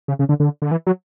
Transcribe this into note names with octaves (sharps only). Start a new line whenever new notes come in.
C#3
C#3
D3
D3
D3
E3
F#3